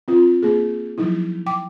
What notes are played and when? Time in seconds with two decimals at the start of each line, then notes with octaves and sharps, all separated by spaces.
0.08 C4 F4
0.43 A#3 G#4
0.98 F3 F#3 D#4 E4
1.46 G5 D6